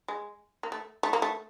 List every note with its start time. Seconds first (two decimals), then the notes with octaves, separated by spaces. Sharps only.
0.08 G#3
0.63 A#3
0.72 A3
1.03 A3
1.13 A#3
1.22 A3